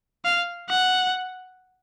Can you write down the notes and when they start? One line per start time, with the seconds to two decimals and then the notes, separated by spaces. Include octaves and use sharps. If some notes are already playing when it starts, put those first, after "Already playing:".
0.25 F5
0.69 F#5